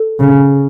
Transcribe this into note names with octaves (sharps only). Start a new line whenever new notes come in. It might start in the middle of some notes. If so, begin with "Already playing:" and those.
Already playing: A4
C#3